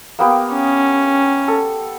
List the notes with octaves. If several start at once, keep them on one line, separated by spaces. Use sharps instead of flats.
A#3 B3 G4
C#4
A4